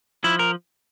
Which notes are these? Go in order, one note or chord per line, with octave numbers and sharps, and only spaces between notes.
F3 E4
A#4